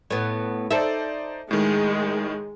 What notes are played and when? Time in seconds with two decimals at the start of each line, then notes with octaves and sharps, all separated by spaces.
0.10 A2 B3
0.71 D#4 A4 C5 D5 E5
1.51 A2 D#3 G#3